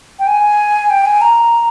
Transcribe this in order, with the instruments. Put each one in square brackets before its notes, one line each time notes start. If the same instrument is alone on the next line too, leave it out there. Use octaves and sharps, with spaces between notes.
[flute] G5
G#5
G5
G#5
A#5